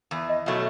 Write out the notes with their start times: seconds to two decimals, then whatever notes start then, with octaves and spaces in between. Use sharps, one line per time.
0.11 E2
0.29 D#5
0.46 B2 F#3 A3 E5